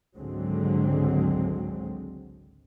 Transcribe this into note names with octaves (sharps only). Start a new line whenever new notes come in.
G#1 C#2 D3 F#3 G#3 C4